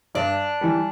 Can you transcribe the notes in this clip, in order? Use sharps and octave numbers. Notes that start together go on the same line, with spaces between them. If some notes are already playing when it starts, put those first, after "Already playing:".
G2 D4
E3 G3